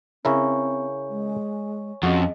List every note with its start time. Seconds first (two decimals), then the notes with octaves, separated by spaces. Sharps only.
0.25 C#3 C4 E4 A#4 C#5 G#5 C#6
1.09 G#3
2.03 F2 C#4 F#4 G#4 D#5